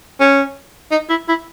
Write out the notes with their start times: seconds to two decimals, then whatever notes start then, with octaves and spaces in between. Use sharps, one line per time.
0.20 C#4
0.91 D#4
1.09 E4
1.28 E4